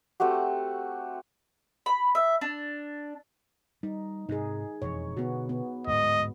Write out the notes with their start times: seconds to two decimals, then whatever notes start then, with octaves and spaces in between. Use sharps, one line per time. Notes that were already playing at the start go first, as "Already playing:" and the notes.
0.20 A3 C4 F#4 G4
1.86 B5
2.15 E5
2.41 D4
3.83 G3 D#4
4.29 G#2 C3 D#4 G#4
4.82 E1 F2 E3 C#5
5.17 B2 D3 B3 F#4
5.49 B3
5.87 D1 G#2 G#3 D#5